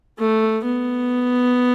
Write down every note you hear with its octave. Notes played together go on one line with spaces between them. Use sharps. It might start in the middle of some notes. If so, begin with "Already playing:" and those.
A3
B3